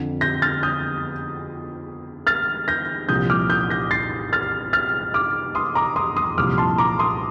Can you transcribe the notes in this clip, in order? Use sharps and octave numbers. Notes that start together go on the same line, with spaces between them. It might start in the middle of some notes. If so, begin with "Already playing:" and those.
Already playing: F2 D3 F3
G6 A#6
F6 A6
D#6 G6
F6 A6
G6 A#6
C2 A#2 F3 D#6 G6
D6 F6
D#6 G6
G6 A#6
A6 C7
F6 A6
F6 A6
D6 F6
C6 D#6
A#5 D6
C6 D#6
C6 D#6
C2 A#2 F3 D6 F6
A5 C6
A#5 D6
C6 D#6